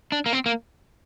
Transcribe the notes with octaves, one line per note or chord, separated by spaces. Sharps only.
D4
A#3
C4
A#3